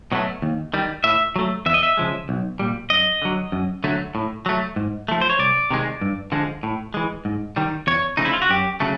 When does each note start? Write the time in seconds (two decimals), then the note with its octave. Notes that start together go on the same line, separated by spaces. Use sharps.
0.12 B2 F#3 A3
0.42 D#2
0.74 D#3 G3
1.04 A2 E5
1.36 F#3 A3
1.66 E2 E5
1.74 D#5
1.83 E5
1.97 C#3 F3 G#3
2.29 B1
2.59 A#2 G3
2.90 F#2 D#5
3.22 D3 F#3
3.52 F#2
3.84 D3 F#3 A3
4.15 A2
4.46 F#3 A3
4.76 G#2
5.08 F3 A3
5.21 C5
5.30 C#5
5.39 C2 D5
5.71 C3 D#3 G#3
6.01 G2
6.32 D3 F3 G#3
6.63 A2
6.94 E3 G#3
7.25 G#2
7.56 D#3 G3
7.87 E2 C#5
8.17 C#3 F3 A3 D#4
8.25 E4
8.33 F4
8.42 F#4
8.50 F#2 G4
8.80 C#3 F#3 A3